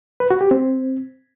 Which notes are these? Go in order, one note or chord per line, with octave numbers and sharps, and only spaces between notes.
B4
F#4
G4
C4